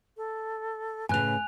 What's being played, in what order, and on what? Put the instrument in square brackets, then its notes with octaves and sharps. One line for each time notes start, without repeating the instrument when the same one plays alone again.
[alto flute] A4
[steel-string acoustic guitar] A2 C#3 [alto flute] B4 [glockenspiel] G#5 F#6 F7